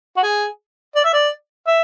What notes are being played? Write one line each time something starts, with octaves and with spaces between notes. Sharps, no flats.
F#4
G#4
D5
E5
D5
E5